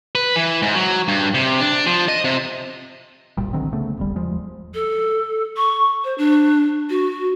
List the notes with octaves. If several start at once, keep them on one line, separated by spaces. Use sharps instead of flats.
B4
E3
G#2
F#3
G2
C3
D4
F3
D#5
C3
F#1 B1 A#2 G3
D3 D#3 F#3 C4
C#3 A3 B3
D#1 G#1 G3
E2 F3 G#3
A4
C#6
C5
D4
F#4